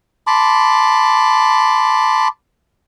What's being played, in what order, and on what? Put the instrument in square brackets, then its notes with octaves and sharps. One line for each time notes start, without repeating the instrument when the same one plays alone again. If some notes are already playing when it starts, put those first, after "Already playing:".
[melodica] A5 B5 C6 D6